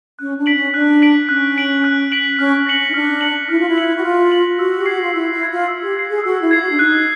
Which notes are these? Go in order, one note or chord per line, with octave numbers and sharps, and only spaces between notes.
C#4 F#6
D4
B6 D7 F#7
C#4
D4 F#6
B6 D7 F#7
C#4 F#6
B6 D7 F#7
F#6
B6 D7 F#7
C#4 F6
A#6 C#7 F#7
C#4
D#4
D4 F6
A#6 C#7 F#7
E4 F6
F4
E4
A#6 C#7 F#7
F#4
F4 F6
A#6 C#7 F#7
F#4 E6
G4
F#4 G#6 C7
F4
E4 E6
E4
G#6 C7
F4
E6
G4
G#6 C7
G#4
F#4 E6
E4
F4 G#6 C7
F#4
D4
D#4 F#6